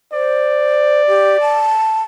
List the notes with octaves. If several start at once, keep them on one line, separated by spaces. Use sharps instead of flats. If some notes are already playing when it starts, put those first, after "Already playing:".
C5 D5
G4
A5